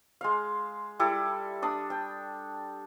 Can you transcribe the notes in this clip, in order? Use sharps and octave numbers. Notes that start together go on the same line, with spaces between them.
G#3 F5
G3 E4 A4 D5
D4 D#6
G5